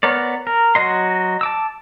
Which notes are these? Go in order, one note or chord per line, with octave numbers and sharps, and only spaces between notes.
B3 A#4 C#5 D5
A#4
F#3 F#4 D#5 C6
A5 D6 E6